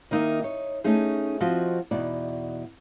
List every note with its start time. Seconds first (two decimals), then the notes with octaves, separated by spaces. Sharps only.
0.11 D#3 A#3 D#4 C5 D#5 E5
0.43 D#4 C#5
0.84 A3 C#4 D#4 G#4
1.40 F3 C4 F#4 D#5
1.91 E2 B2 D#4 D5 F#5